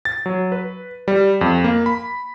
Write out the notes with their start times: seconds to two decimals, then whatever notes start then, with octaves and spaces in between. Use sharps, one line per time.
0.05 A6
0.26 F#3
0.52 B4
1.08 G3
1.41 F2
1.64 A#3
1.86 B5